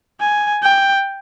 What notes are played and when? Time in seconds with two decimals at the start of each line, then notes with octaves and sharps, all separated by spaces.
0.20 G#5
0.63 G5